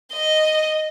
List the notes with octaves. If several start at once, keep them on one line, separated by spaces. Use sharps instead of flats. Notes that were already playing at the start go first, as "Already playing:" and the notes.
D#5